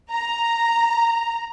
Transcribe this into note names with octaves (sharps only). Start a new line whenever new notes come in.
A#5